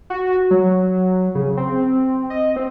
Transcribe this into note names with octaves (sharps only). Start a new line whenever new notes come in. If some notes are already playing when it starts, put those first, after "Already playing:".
F#4
F#3
C#3
C4
D#5
C4